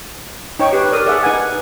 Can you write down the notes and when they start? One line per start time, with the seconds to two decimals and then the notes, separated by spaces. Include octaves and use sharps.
0.59 D#4 C#5 G5 C#6
0.73 G4 B4
0.92 A#4 D5 D#6
1.06 G#4 D5 E5 F#5
1.23 D#4 B4 F#5 G#5